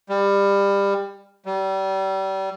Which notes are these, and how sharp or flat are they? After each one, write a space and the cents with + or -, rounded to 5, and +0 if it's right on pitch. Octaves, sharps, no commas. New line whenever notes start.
G3 +25
G3 -30